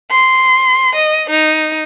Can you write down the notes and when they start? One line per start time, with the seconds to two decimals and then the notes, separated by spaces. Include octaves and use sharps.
0.11 C6
0.96 D#5
1.30 D#4